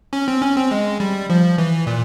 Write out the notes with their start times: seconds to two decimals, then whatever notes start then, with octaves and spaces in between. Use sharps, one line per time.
0.13 C#4
0.28 C4
0.42 C#4
0.56 C4
0.71 G#3
1.00 G3
1.30 F3
1.58 E3
1.87 A#2